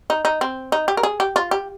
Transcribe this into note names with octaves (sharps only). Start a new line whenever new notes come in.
D#4
D#4
C4
D#4
G4
A#4
G#4
G4
F4
G4